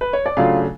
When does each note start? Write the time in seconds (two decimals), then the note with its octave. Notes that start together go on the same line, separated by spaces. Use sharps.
0.01 B4
0.13 C#5
0.26 D5
0.37 C#3 F#3 A3 D4 F4 F5